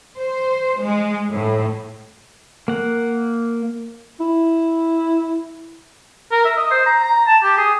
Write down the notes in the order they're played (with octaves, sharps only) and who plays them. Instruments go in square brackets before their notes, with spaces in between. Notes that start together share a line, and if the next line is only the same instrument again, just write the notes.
[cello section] C5
G#3
A2
[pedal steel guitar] A#3 F#5
[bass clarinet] E4
[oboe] A#4
E5
D#5
C5
A#5
A#5
A5
G4
G#4